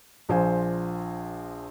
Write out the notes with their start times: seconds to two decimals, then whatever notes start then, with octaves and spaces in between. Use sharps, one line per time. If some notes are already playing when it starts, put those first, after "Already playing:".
0.29 A#1 F3 C5 G#5